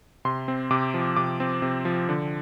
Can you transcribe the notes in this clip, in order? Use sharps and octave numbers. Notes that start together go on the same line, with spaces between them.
C3 C6
C4
C3 D6
F3
C3 D6
C4
C3
F3
D3